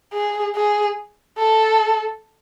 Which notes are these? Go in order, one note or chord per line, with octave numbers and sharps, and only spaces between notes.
G#4
G#4
A4